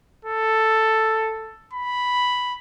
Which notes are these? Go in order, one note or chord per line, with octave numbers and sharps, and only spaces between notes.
A4
B5